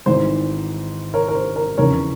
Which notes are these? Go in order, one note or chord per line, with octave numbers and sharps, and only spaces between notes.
G#1 G#2 E3 C5
A#4 C#5
A#4
C5
A#4
F1 E2 C#3 E3 A#4 C#5